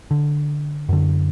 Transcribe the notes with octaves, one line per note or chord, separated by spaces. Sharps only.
D3
F#2 D3